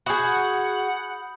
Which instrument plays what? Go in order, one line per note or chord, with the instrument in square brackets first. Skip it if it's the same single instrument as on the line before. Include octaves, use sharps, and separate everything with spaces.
[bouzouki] F#4 G#4 [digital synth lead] F#5 [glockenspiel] B5 D#6 G6